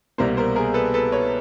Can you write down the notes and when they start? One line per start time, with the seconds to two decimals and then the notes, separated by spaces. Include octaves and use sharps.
0.18 C2 B2 G3 A#3 A#4 C5
0.37 A#4 C5
0.56 G#4 A#4
0.74 A4 B4
0.94 A4 B4
1.12 B4 C#5